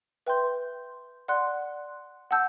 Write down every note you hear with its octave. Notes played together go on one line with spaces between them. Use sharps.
B4 E5 G5 C6 G6
D5 F#5 C6 F#6
F#5 A5 E6 G6